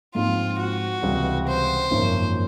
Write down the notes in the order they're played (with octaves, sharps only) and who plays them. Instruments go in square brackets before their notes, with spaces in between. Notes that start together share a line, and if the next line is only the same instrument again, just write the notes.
[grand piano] G#2 F3 G#3 C4 D#4 [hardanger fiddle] F4
[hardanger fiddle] F#4
[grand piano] C#2 C3 E3 G3
[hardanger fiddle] C5
[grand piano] G#1 F#2 C#3 F3 A#3